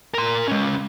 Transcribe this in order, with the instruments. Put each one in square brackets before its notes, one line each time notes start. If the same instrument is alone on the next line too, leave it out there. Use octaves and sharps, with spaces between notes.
[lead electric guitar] A#4 C6
G#3 C#4